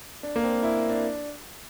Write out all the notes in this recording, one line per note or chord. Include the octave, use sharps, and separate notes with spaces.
D4
A#3
C4
E4
D4